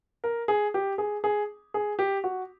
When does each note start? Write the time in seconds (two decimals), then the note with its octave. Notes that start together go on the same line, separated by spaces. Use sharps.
0.24 A#4
0.48 G#4
0.74 G4
0.98 G#4
1.24 G#4
1.74 G#4
1.99 G4
2.24 F#4